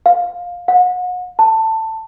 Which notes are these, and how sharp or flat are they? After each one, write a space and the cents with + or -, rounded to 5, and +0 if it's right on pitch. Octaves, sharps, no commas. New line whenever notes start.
F5 +15
F#5 -35
A5 +15